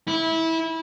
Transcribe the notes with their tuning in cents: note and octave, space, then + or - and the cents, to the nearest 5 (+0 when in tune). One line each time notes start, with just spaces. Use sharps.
E4 -20